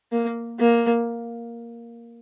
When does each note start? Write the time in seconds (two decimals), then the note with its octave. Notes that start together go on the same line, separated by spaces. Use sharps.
0.12 A#3
0.60 A#3